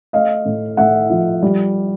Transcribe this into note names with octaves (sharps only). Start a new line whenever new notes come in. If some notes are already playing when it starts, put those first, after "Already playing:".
A3 D#5 F5
A2
A2 E5 F#5
F3
G3